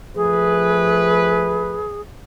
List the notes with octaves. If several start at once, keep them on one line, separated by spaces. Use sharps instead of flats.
F3 A3 G#4 B4